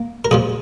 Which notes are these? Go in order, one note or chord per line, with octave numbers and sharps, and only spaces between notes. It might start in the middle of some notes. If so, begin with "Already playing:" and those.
Already playing: A#3
A#4
A#1 A#2 F3 G#4